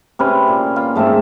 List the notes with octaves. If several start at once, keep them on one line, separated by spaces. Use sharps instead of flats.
C3 C#4 B4 C6
A#2
F4
G#2 A3 C4 E5